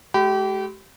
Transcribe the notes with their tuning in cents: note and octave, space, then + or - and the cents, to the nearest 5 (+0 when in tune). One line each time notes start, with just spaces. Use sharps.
G#3 +45 G4 -30 B5 +25